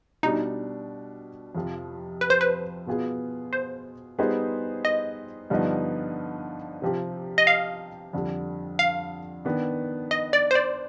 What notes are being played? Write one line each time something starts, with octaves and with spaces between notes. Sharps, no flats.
B2 G3 D4 D#4
F2 C3 F3
B4
C5
B4
B2 B3 F4 G#4
C5
G3 B3 D#4 G#4 C5
D#5
G2 D3 F3 B3 D#4
C3 F3 C4 G4
D#5
F5
F2 D3 G3
F5
D#3 B3 D4
D#5
D5
C5
D5